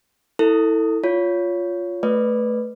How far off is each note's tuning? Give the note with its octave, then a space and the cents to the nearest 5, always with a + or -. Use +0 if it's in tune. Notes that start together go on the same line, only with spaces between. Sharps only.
E4 -20 A4 +20
F4 +0 C#5 +15
A3 +0 B4 +0 D5 +0